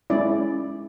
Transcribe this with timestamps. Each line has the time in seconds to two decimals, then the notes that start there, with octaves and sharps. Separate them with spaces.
0.10 G#3 C#4 E4 D5